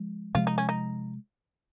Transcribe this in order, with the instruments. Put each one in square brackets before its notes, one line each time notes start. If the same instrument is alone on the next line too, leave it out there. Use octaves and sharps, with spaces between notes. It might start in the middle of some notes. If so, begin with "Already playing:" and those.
Already playing: [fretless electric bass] F3 G#3
[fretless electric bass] C3 F3 G#3 [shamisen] F4
[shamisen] D#4
C#4
D#4